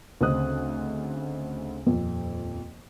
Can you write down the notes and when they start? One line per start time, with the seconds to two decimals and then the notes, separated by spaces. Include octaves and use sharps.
0.21 D2 C#3 C4 D#5 D#6 F#6
1.87 D#1 F2